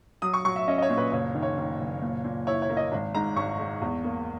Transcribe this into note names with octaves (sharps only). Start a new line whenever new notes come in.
F#3 D#6
C#6
F#3 C#6
E5
C#4 D#5
D#5
C#5
A#2
B4
F#1 C#5
D#3
C#5
D#3
F#1
A#2
A#2
E4 C#5
C#5
A#3
D#5
G#1
G#2 A#5
G#1 C#6
G#3
E2
A#3